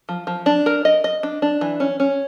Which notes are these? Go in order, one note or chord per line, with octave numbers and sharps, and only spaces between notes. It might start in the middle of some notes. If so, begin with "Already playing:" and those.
F3
F3
D4
A#4
D#5
D#5
D4
D4
E3
C#4
C#4